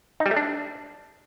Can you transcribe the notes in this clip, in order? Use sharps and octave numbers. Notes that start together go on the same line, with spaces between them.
D#4
G3
A3
D4